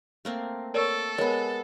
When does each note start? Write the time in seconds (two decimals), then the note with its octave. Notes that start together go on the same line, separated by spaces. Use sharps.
0.25 A3 A#3 C4
0.74 A4 A#4 C#5 D5 C#6 E6 D7
1.18 G#3 B3 A#4 C#5